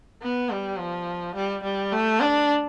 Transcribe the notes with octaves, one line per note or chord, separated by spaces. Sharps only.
B3
G3
F3
G3
G3
A3
D4